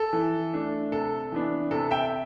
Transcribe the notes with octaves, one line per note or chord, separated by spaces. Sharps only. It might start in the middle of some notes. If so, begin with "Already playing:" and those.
Already playing: A4
E3
A3 D4
C3 A4
E3 B3 D4
C3 A4
E5 G5